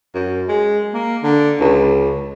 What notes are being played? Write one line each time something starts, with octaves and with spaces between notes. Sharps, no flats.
F#2
G#3
A#3
D3
C#2